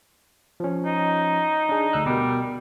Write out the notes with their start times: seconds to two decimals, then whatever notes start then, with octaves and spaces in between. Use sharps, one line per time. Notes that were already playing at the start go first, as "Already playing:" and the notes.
0.60 F3 C#4
0.85 D#4
1.69 D4 G#4
1.93 D2 E6 F#6
2.06 B2 G3 B3 A#4